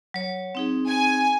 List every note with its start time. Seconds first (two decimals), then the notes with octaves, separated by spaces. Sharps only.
0.14 F#3 C#5
0.55 C4 D#4 G#4
0.88 G#5